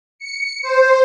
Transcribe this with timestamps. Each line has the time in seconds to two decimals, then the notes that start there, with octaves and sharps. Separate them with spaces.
0.19 C#7
0.62 C5